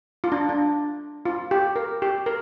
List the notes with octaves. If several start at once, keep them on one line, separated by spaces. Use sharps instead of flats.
F4
D4
D4
F4
G4
A#4
G4
A#4